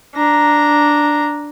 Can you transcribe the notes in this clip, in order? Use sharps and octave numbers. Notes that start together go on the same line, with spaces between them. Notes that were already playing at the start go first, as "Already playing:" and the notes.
D4 A#5